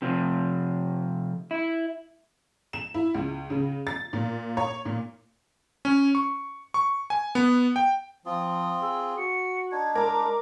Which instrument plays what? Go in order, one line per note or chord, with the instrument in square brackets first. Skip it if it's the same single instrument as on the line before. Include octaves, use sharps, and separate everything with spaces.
[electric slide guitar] C3 F3
E4
[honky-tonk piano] E7
E4
C#2
C#3
A6
A#2
C#5
A#2
[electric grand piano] C#4
C#6
C#6
G#5
B3
G5
[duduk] F3 [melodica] C4 F4 [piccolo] D#6
[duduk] G#4 [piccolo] E6
[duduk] F#4 [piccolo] C#7
[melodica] D4 D#4 [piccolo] G#6
[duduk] G#3 [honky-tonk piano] A#4 [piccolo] D6